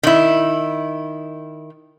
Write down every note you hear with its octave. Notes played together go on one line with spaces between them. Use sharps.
D#3 E4